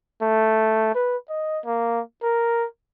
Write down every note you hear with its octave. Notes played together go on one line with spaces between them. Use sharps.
A3
B4
D#5
A#3
A#4